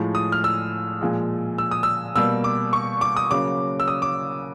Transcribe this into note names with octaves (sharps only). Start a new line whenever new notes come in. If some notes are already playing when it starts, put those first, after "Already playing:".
Already playing: A2 F3 G#3
D#6
F6
E6
A#2 F3 G#3
E6
D#6
E6
B2 G3 A#3 E6
D6
C#6
D6
D#6
C#3 F#3 A#3 D6
E6
D#6
D6